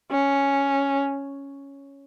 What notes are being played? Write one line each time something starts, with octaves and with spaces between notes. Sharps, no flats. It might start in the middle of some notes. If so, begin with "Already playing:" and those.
C#4